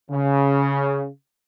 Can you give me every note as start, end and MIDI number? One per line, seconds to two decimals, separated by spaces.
0.11 1.07 49